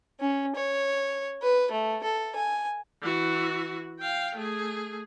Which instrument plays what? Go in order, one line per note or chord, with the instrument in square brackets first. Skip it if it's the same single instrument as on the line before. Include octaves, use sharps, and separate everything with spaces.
[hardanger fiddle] C#4
C#5
B4
A3
A4
G#5
[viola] E3 F#4
F5 G5
A3 G#4